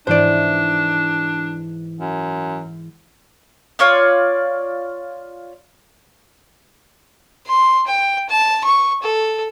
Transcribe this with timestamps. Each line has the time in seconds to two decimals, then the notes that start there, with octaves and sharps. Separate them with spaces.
0.07 G#2 E3 D4 C5 D5
2.00 F#2
3.79 F4 C#5 D5
7.46 C6
7.87 G5
8.29 A5
8.65 C#6
9.03 A4